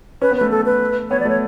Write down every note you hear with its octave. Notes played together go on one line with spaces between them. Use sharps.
C#4 B4
B3
A3 B4
A4
B4
B3 C#5
D5
A3
C#5